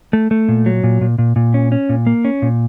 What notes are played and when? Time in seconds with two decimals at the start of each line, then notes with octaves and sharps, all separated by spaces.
0.13 A3
0.31 A3
0.49 A#2
0.66 F#3
0.84 A#2
1.01 A#2
1.18 A#2
1.36 A#2
1.54 C#4
1.72 C#4
1.89 A#2
2.07 A#3
2.25 C#4
2.42 A#2